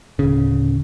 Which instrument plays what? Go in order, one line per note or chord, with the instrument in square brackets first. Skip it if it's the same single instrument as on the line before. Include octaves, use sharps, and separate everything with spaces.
[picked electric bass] D1 C#3